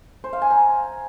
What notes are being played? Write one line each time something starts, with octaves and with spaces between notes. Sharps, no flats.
C5
F5
G#5
A#5